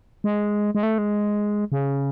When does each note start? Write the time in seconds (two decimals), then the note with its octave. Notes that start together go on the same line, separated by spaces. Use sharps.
0.24 G#3
0.75 G#3
0.83 A3
0.98 G#3
1.72 C#3